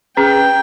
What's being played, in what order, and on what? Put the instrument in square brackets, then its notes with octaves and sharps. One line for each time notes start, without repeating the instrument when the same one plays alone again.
[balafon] C#4 G#4 B4 [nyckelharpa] G5